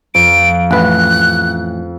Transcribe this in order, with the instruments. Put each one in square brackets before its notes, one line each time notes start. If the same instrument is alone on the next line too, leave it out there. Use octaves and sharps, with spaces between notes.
[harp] F2 [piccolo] D7
[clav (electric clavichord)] A1 B4 [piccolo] F#6